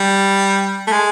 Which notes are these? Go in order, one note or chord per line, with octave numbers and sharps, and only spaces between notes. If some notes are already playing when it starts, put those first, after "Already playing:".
Already playing: G3
A3
G#3